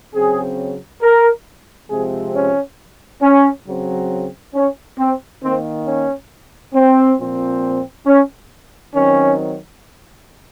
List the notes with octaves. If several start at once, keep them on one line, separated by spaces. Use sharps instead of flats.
C#3 F#3 C4 G#4
A#4
C3 F3 G#3 C4 G#4
C#4
C#4
C#3 F#3 C4
C#4
C4
D#3 A#3 C4
C#4
C4
A#2 F3 C4
C#4
D#3 F#3 C4 C#4